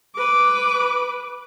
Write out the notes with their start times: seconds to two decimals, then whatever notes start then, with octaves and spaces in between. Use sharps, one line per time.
0.15 B4 D6